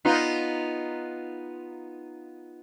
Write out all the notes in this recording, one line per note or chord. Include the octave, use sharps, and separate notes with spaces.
B3 D#4 F4